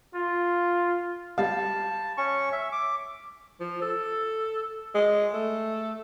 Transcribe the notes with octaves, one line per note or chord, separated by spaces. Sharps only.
F4
G3 F5 A5
C#4 C#6
E5
D6
F3
A4
G#3
A3